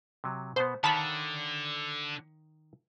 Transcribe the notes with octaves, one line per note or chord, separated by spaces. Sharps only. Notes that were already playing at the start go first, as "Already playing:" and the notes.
C3 F#3
B2 B3 C5
D3 D#3 C#5 F5 A5 B5